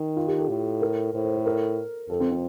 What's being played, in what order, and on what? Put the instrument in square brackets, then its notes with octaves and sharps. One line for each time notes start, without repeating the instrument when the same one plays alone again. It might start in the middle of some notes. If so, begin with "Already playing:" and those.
Already playing: [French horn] D#3
[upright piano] F4
G4
A4
[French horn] A2
[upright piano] A#4
[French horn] A2 [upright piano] C5
[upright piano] C5
A4
A#4
[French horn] F2 [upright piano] A4
[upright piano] C4
C4